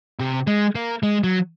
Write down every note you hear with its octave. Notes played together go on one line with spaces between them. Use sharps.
C3
G#3
A#3
G#3
F#3